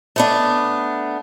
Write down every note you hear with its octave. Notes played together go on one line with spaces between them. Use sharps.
A3 B3 D4